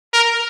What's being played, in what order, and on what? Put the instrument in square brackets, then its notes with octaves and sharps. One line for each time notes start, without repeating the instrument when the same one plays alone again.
[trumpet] A#4